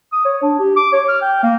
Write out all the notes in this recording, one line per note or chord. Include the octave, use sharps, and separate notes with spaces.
D#6
C#5
D4
G4
D6
C#5
F6
G5
A#3